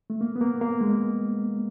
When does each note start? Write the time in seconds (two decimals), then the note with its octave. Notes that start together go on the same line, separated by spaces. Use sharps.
0.10 A3
0.21 A#3
0.36 B3
0.41 A#3
0.61 A#3
0.81 G#3